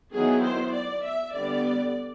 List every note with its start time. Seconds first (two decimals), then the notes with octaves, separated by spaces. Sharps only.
0.13 D#3 F#3 B3 E4 G#4
0.43 C5
0.73 D5
1.04 E5
1.33 D3 G3 B3 D5